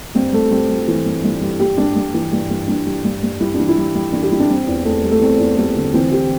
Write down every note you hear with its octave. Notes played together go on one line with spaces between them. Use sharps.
G2 C4
G2 A3
G3 C4
G3
E3
G2
G2
G3
G2 G4
G2 D4
G2
E3
G2
G2
G2 D4
G3
G2
G2
G3 E4
D4
E3
E4
G3
G3
E3 D4
G4
G2 E4
D4
G3 C4
E2
E2 A3
G3
A3
E2 C4
E2
G3 A3
D3
E3 C4
E3 G4